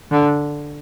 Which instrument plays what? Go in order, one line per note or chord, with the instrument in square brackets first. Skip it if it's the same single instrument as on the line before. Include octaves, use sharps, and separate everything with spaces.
[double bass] D3